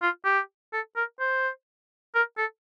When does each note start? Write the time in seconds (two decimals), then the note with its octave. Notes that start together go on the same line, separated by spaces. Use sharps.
0.02 F4
0.25 G4
0.73 A4
0.96 A#4
1.20 C5
2.15 A#4
2.38 A4